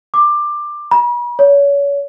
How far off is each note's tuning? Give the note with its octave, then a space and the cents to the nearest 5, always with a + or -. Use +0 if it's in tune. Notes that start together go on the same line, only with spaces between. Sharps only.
D6 +15
B5 -45
C#5 +30